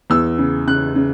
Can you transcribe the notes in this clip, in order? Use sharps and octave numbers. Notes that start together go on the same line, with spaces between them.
E2 E6
C#3
C#3 F#6
C#3